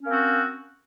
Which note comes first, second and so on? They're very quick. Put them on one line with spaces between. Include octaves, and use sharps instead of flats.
C#4 A#3 C4 F#4